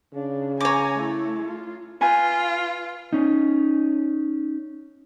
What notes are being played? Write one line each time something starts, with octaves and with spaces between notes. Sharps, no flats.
C#3 D4
C#5 G#5 A#5 D6
A3 E4
F4
F4 B4 G#5
C#4 D#4